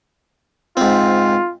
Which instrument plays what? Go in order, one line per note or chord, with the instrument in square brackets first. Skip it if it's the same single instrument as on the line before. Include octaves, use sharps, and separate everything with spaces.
[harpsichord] G#2 C4 [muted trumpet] F4